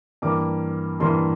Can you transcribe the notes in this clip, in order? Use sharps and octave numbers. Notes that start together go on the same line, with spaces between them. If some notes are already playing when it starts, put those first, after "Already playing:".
G2 E3 A#3 D6
G2 E3 A#3 C6